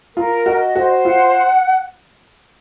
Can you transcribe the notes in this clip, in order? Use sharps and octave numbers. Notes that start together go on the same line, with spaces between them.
F4 A#4
F#4 D#5
F#4 C5
F4 F#5